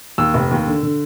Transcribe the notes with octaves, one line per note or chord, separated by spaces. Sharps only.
D#2 E6
F1
D#2
D3
D3